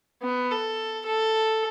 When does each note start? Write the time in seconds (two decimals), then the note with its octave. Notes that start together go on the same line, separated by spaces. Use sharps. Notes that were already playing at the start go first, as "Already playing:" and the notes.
0.23 B3
0.51 A4
1.06 A4